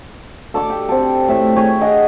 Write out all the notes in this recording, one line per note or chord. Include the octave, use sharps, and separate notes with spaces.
A4 D5 D6
G4
C4 A4
A2 A4 E5
G#4 C#5 G5 G#5
G#4 D#5 F#5 G5